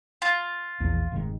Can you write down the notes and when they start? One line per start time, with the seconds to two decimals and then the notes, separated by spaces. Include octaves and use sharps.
0.22 F4
0.80 A#1 E2 F3
1.12 F1 G#2 D#3